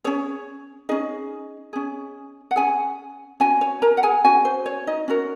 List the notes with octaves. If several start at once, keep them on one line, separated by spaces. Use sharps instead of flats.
C#4 G#4 C#5
C#4 D#4 G#4 D#5
C#4 G#4
F#5
C#4 G#4 G#5
C#4 F#4 G#5
C#5
A#4 A#5
F#5
G#4 G#5
C#4 F#4 G#5
C5
C#5
D#4 D#5
C#4 F#4 A#4